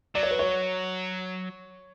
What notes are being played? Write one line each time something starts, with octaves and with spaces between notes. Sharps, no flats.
F#3 D5
C#5
B4
C#5